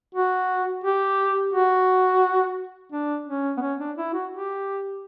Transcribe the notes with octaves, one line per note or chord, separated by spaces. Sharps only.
F#4
G4
F#4
D4
C#4
B3
C#4
D4
E4
F#4
G4